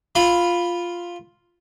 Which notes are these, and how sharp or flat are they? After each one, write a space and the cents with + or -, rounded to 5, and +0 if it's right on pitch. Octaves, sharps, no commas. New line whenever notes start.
F4 +0 B5 +0